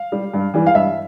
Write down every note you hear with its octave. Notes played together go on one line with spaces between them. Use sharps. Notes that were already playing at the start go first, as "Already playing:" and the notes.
Already playing: F5
G3
G2
E3 G3
F5
G2 E5